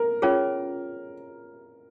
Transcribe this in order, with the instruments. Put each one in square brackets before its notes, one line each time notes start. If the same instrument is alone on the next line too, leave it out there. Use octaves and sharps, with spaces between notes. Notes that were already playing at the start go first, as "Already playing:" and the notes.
Already playing: [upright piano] A#4
[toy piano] C#4 F4 G#4 C#5